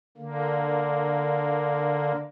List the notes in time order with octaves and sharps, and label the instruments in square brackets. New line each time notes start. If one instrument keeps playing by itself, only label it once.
[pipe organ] D3 A#3